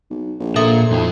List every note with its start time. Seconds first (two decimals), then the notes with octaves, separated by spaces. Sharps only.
0.10 B1
0.40 A#1
0.56 A#2 A4 E5 D#6
0.91 B1 F2 F3